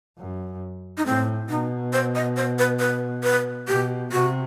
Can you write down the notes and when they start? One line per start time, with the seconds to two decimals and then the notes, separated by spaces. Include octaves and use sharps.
0.18 F#2
0.97 D#4
1.05 A2 C4
1.50 B2 D#4
1.93 C5
2.15 D#5
2.37 C5
2.59 B4
2.80 B4
3.24 B4
3.68 B2 G4
4.12 C3 F#4